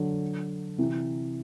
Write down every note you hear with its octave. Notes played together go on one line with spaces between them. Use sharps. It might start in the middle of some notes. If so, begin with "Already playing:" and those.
Already playing: D3 F#3
C3 E3